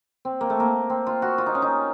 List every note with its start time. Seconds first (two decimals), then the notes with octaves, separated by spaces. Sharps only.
0.25 C4
0.41 A#3
0.50 A3
0.60 A#3
0.90 C4
1.07 F4
1.22 F#4
1.38 F4
1.46 D#4
1.55 C#4
1.62 D#4